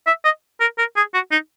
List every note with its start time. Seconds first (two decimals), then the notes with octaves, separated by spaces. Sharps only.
0.07 E5
0.24 D#5
0.61 A#4
0.78 A#4
0.97 G#4
1.14 F#4
1.32 D#4